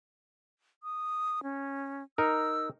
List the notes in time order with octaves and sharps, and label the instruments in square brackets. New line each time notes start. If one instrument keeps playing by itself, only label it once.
[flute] D#6
C#4
[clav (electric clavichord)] D#4 A#4 [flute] E6